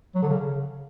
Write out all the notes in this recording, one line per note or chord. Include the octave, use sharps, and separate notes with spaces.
F#3
D3
C#3